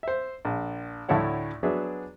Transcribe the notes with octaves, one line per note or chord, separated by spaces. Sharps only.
C5 E5
A#1
D2 A2 A3 E4 C#5 F#5
F#3 B3 D4 G#4 E5